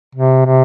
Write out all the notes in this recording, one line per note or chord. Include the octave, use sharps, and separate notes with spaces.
C3
C3